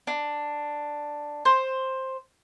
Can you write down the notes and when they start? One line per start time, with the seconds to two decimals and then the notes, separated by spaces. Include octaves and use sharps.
0.07 D4
1.45 C5